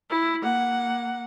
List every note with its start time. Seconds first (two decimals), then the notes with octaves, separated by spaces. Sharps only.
0.10 E4
0.43 A#3 F#5